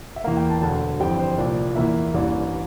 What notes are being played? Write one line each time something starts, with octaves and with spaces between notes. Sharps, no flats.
E5
E2 E3 A#3 F5
G5
A5
E1 D2 D3 A5
G1 F2 E3 G3 C4 G5
C5
C2 A#2 F3 D5
E2 E3 A#3 E5
A1 G2 E3 A#3 D5